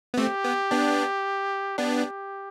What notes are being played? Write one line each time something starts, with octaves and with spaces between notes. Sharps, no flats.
B3
A3 C4 G4
B3
B3 D4
B3 D4 G4